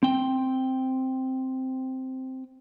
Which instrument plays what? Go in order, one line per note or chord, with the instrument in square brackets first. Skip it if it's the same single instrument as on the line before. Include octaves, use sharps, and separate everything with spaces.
[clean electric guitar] C4 G5